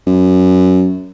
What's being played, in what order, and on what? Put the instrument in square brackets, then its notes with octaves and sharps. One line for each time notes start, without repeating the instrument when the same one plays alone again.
[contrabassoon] F#2